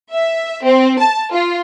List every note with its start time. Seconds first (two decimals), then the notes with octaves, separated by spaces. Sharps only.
0.11 E5
0.64 C4
0.99 A5
1.30 F4